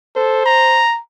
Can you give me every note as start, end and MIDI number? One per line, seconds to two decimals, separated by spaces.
0.16 0.43 69
0.16 0.82 72
0.46 1.00 82